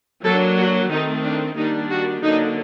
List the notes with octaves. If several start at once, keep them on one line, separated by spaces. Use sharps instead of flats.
F#3 A#3 D4 A4
F#4
D#3 A3 C4 D#4
D4
D#3 G3 A#3 D4 D#4
F#4
D3 F#3 A#3 D4 D#4